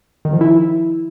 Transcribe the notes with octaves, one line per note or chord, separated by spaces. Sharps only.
D#3
F3
E4